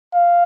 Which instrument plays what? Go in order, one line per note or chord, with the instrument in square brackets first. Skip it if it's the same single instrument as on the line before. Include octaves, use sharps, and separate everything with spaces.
[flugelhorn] F5